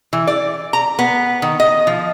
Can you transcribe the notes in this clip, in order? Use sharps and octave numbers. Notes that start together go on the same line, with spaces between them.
E3
D5
A#5
B3
D#3
D#5
F3